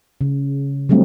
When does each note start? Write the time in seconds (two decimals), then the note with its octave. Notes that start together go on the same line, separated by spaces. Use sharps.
0.21 C#3
0.89 F#3 G3 A3 C4 D4